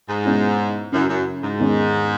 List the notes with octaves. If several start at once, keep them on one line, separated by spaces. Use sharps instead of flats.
G#2
B2 G#3 C#4 E4
F#2 C#3 F#3 C#4 E4
F#2
G#2
E2 D#3 G#3 C#4